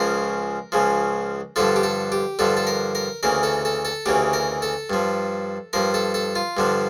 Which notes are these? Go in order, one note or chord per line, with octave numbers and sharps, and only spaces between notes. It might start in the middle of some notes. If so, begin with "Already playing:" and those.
Already playing: C#2 C#3 F3 A#4
C#2 C#3 F3
G2 D3 F3 A4
G4
A4
G4
G2 D3 F3 A4
A4
A#4
A#4
D2 C#3 E3 A#4
A4
A4
A4
D2 C#3 E3 G4
A#4
A4
G2 F3
G2 F3 A#4
A4
A4
F4
G2 D3 F3